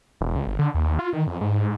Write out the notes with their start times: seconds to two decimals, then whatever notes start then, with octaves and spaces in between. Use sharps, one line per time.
0.21 E1
0.35 C#2
0.47 G1
0.59 D3
0.74 D#2
0.99 F4
1.13 D#3
1.27 F2
1.41 G#2